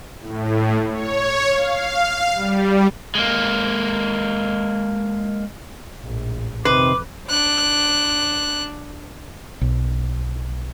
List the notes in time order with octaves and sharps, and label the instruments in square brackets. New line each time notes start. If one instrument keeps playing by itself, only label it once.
[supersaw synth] A2
C#5
F5
G3
[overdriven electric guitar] G#3 A#3
[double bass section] A#1 A2
[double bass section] F2 [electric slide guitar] C3 D#3 C5 [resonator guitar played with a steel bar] B4 [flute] D6
[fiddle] D4 F#6
[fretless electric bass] B1